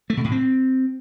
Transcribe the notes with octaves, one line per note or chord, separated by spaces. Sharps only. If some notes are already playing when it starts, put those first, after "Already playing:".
A3
B2
A2
C4